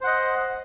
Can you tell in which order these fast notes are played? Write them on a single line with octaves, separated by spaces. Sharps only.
C5 F#5 D#5